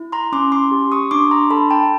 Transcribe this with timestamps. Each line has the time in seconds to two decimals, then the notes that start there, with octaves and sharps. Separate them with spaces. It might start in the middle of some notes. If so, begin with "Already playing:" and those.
Already playing: E4
0.12 A#5 C6
0.32 C#4 C6 D6
0.52 C6 D6
0.72 G4
0.92 C#6 D#6
1.11 D4 C6 D6
1.31 A#5 C6
1.50 A4 A5 B5
1.71 G5 A5